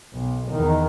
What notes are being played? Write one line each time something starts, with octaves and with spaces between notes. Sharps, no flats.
B1
E2 D#3